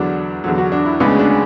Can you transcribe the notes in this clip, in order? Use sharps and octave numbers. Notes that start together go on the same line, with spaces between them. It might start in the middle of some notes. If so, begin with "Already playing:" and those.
Already playing: E2 D3 F#3 D4
E2 D3 F#3
F#4
D4
E4
D2 C#3 G#3 B3 D4
C#4
D4